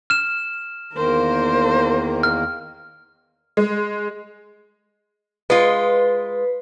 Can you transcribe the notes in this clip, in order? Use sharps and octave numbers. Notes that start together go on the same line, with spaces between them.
F6 E7
E2 D#3 A#3 A#4 C5
F6
G#3
G#3 F4 B4